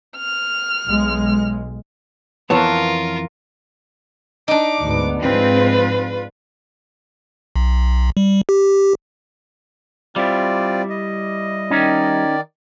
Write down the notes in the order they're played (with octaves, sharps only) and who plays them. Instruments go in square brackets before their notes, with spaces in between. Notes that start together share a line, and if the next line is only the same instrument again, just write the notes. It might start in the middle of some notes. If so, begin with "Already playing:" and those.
[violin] F6
[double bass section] B1 G#3
[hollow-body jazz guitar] F2 E3 B3 [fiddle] F4 A#4 [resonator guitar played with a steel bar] C#5 A5
[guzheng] D4 D#4 [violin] D6
[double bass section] D2 G#2 B3
[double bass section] G#2 F3 G#3 [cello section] C4 [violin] F4 B4
[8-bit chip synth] B1
G3
G4
[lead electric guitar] G3 E4 [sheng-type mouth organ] C4 F4 D5
[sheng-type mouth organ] D#5
[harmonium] D#3 D5 [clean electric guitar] C#4 D#4